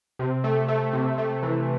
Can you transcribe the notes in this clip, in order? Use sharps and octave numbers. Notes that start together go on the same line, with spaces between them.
C3
A3
A3
C3
A3
E3